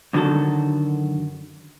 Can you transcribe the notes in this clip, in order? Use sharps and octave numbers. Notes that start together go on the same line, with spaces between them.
F#2 D3 D#3 F#3 F#4 A4